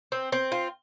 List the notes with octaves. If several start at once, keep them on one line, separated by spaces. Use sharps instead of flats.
C4
C4
F4